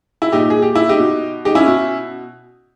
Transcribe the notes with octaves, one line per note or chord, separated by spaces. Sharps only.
E4
A#2 D#4 G4
G#4
G4
E4
D#4 G4
B2
D#4 G4
C#4 E4
B2